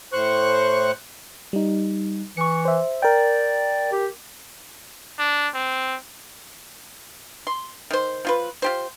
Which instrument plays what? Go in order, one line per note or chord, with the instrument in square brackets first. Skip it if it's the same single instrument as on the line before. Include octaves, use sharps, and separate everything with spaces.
[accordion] A2 C5 C#6 F#6
[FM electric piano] G3 D#4
[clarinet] E3 [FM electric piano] C#6 C#7
[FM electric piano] C5 E5
[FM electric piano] A#4 G5 [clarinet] D5
[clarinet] G4
[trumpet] D4
C4
[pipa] C6
D#3 C5
F3 F4 B4
F4 G4 C5